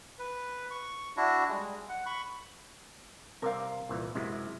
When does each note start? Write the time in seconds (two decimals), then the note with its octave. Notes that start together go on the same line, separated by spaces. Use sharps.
0.19 B4
0.71 C#6
1.17 D4 E4 F#4
1.49 G3 G#3
1.89 F#5
2.06 B5 C#6
3.42 C3 G3 A#4 F5
3.89 C2 A#2 E3
4.15 F#2 C3 G#3 E4